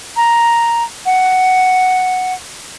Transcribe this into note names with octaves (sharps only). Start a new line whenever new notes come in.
A#5
F#5